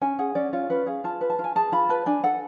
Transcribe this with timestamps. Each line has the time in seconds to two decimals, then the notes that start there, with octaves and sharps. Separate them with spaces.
0.01 C#4 G#5
0.19 G#4 F#5
0.35 C#4 D5
0.53 F4 C#5
0.70 C#4 B4
0.86 G#4 F5
1.04 F4 A5
1.21 B4
1.30 A5
1.39 F4
1.44 G#5
1.55 G#4 A5
1.72 F4 B5
1.89 B4 A5
2.06 D4 G#5
2.24 A4 F#5